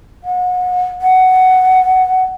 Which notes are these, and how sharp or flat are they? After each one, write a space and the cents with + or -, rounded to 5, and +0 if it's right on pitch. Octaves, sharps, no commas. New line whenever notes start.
F#5 -35
F#5 +10